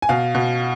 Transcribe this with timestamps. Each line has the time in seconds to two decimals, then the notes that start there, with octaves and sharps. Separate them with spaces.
0.02 G#5
0.09 B2 F5
0.35 B2